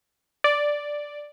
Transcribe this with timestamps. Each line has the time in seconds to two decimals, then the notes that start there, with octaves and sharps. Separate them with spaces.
0.44 D5